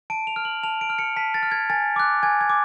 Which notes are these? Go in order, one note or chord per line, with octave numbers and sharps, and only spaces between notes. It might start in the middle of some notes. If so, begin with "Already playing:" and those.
A5 D7
F7
F6
F#7
A5 F7
D7
F6
C#7
A5 B6
A6
F6
G#6
G#5 A6
D6 F#6
G#5 G#6
G#6
D6